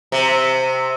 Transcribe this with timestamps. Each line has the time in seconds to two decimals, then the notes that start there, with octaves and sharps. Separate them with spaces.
0.12 C3